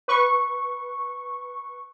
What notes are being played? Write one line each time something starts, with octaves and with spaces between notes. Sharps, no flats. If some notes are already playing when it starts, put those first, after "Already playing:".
B4 C#6